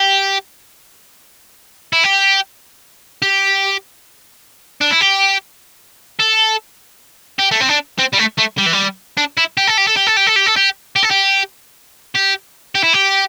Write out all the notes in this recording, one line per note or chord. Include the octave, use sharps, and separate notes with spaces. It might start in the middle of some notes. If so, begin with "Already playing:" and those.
Already playing: G4
E4
G4
G4
D4
E4
G4
A4
G4
A3
C4
D4
C4
G3
A3
A3
G3
E3
G3
D4
E4
G4
A4
G4
A4
G4
A4
G4
A4
G4
A4
G4
G4
A4
G4
G4
G4
E4
G4